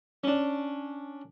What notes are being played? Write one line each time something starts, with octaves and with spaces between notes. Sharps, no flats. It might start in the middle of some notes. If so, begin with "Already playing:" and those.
C#4 D4